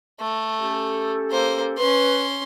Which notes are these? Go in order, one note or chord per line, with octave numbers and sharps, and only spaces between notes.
A3
C#4 G4 A4
A#3 C5
C#4 B4 C6